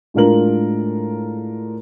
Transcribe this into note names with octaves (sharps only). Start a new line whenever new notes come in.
A2 G#3 D4 F4 A#4 F#7